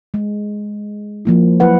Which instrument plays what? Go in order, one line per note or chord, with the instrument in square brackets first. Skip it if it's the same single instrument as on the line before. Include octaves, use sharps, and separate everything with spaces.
[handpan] G#3
F3 A#3 E4
F#3 E4 B4 F#5